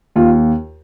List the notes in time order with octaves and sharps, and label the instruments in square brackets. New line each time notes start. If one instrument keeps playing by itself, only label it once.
[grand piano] D#2 F4